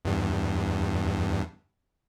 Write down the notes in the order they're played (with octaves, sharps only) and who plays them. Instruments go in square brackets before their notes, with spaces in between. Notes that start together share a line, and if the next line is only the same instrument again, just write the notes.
[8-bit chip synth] E2 G2